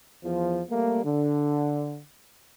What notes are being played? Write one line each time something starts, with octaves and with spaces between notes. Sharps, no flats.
E2 F3
G3 A3 A#3
D3